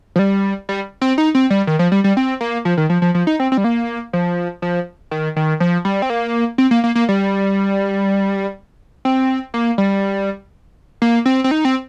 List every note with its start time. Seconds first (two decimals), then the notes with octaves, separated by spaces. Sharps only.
0.16 F3
0.19 G3
0.69 G3
1.01 C4
1.18 D#4
1.35 C4
1.50 G3
1.67 D#3
1.79 F3
1.92 G3
2.04 G3
2.17 C4
2.41 A#3
2.65 F3
2.77 D#3
2.90 F3
3.02 F3
3.15 F3
3.27 D#4
3.40 C4
3.52 C4
3.57 G3
3.64 A#3
4.13 F3
4.62 F3
5.11 D#3
5.36 D#3
5.60 F3
5.85 G3
6.02 C4
6.10 A#3
6.58 C4
6.71 A#3
6.84 A#3
6.95 A#3
7.09 G3
9.05 C4
9.54 A#3
9.78 G3
11.02 A#3
11.26 C4
11.44 C4
11.51 D#4
11.65 C4